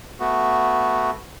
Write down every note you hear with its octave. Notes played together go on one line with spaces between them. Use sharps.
A3 B3 F#4